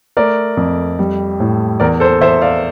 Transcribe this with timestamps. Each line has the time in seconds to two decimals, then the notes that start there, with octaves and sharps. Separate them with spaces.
0.17 A3 A#4 D5
0.57 F2
0.99 G3
1.40 A2
1.80 E2 A#4 D5
2.00 A4 C5
2.21 E2 C5 E5
2.42 D5 F5